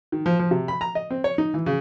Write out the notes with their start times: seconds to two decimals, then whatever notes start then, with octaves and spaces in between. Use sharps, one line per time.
0.12 D#3
0.26 F3
0.39 F3
0.51 C3
0.68 B5
0.81 A#5
0.95 D#5
1.10 C4
1.24 C#5
1.38 D#4
1.54 E3
1.66 C#3